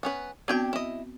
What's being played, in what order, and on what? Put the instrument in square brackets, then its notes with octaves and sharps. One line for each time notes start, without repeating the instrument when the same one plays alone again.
[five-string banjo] B3 C#4 B4
[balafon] B3 C4 F#4 [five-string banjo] D4 G4 G5
[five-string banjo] E4 D#5